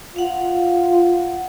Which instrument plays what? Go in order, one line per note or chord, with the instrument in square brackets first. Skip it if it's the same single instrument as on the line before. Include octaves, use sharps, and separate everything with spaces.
[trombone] F4 [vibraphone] F5 F#5